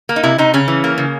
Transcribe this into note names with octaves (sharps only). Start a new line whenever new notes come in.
A#3
D#4
C3 E4
C3 D#4
C#3 C#4
E3
A#3
C#3